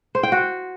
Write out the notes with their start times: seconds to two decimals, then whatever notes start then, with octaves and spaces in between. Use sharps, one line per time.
0.15 C5
0.23 G5
0.32 F#4